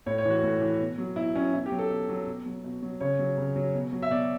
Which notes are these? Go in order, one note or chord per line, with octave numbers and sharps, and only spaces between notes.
A2 C#5
C#5
E3
F#4
A2
E3
B2
F#3
B2 E4
F#3 C#4
B2 E4
G4
F#3
A4
B2
F#3
B2
F#3
B2
F#3
C#3 C#5
F#3
C#3
F#3
B2
F#3
E5
B2 D5